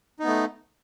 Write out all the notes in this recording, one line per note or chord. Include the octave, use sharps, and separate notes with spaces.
A3 B3 D#4